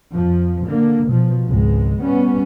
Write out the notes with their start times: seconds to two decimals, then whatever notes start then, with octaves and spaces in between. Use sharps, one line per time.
0.13 F2 F3
0.66 D3 A#3
1.09 B2 F3
1.48 G#1 C#2 G#3
2.01 G3 B3 C#4